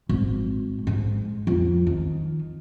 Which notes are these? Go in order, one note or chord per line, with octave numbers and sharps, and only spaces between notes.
G#1
G#2
F2
D#3